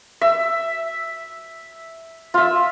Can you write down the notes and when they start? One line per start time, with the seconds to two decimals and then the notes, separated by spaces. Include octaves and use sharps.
0.21 E5
2.34 F4 E5